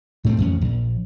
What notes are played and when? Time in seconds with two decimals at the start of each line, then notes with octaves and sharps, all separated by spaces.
0.25 A2 A3 B3 C4
0.38 A1 F2 C#4
0.61 A#1